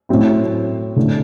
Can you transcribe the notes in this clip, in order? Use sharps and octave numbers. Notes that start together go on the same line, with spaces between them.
A2 F#3 C4 E4
D3 A3 D4